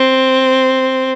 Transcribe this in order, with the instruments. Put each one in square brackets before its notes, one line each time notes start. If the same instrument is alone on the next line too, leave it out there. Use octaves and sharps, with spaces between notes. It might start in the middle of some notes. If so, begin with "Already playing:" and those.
Already playing: [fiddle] C4